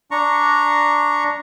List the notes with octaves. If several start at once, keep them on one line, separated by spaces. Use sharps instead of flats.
D4 A#5 C#6